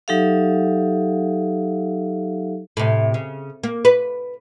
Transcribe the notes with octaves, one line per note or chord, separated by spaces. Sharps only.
F#3 D#4 G4 A4 E5 F5
A2 C3
C#3
A#3
B4